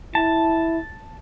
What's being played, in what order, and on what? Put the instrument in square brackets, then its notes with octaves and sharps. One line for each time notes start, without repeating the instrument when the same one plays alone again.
[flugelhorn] E4 [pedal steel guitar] A5